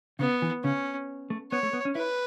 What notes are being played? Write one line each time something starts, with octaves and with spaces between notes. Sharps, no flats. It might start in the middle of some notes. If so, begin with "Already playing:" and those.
C#3 B3
E3
C#3 C#4
A3
B3 C#5
A3
B3
C#4
E4 B4